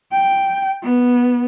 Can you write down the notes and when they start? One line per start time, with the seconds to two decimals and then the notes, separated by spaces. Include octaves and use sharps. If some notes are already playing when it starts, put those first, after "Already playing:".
0.13 G5
0.83 B3